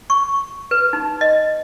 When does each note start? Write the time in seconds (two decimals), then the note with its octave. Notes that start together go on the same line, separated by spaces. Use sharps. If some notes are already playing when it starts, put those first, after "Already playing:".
0.10 C#6
0.71 B4
0.93 D#4
1.21 D#5